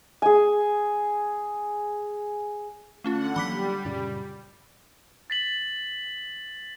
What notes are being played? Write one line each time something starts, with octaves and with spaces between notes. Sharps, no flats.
G#4 G#5
D3 A3 C#4 F4 F#5
E3 F#3 G3 A#3 B5 D6 B6
F#2 A#2 C#3
A6 B6 F#7